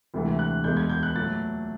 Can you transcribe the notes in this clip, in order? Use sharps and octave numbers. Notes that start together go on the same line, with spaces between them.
D2 C3 E3 G#3
F#6
E2 B2 G#3 G6
G#6
G6
F#6
A#2 F#3 A3 A6